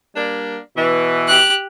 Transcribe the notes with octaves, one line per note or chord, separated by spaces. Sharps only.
G3 A#3 D4
B2 E3
G4 F#6